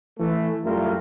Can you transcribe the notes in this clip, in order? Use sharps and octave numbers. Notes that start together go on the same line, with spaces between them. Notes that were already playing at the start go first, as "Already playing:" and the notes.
E3 A3
F#2 G3 A3 E4 F4 A#4